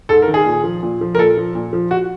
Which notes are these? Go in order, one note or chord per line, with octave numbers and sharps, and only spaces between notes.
G#2 A4
A#4
D#3
G#4
A#2
F3
A#2
F3
A#4
A#2 A4
F3
A#2
F3
F#4